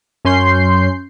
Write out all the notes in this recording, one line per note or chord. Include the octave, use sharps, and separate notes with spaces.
F#2 C#4 C6 G6 C7